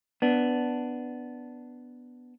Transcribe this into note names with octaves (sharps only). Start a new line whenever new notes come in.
B3 D4